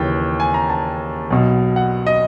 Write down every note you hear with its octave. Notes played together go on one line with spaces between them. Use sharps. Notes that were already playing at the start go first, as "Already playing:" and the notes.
Already playing: D#2 C#3 E3 G5
G#5
A#5
A5
B1 B2
F#5
D#5